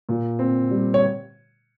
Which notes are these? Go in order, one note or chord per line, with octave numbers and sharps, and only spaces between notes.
A#2
C4
G3
C#5